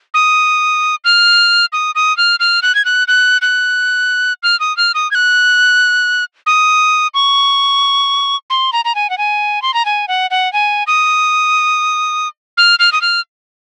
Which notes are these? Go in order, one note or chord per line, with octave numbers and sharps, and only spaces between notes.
D#6
F6
D#6
D#6
F6
F6
F#6
G#6
F#6
F#6
F#6
F6
D#6
F6
D#6
G#6
F#6
D#6
C#6
C6
A#5
A#5
G#5
F#5
G#5
C6
A#5
G#5
F#5
F#5
G#5
D#6
F6
F6
D#6
F6